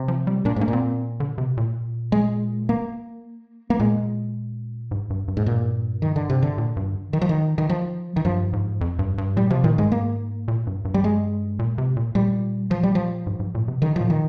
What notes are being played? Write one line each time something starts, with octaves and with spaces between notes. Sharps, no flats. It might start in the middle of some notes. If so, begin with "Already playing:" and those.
Already playing: C3
F3
G3
A#2 D4
G#2 A#3
A#2
C4
D3
C3
A#2
G#3
A#3
A#3
A#2 G#3
G#2
G2
G2
G#2
A#2
D#3
D3
C3
D3
A#2
G2
D#3
F3
D#3
D#3
F3
D#3
G2 F3
G#2
F2
G2
G2
A#2 G3
C3 F3
A#2 D#3
G#2 G#3
A#3
A#2
G2
G2
G3
G#3
A#2
C3
A#2
A#2 G3
F3
G3
F3
G#2
G#2
A#2
C3
D3 D#3
A#2 F3
D#3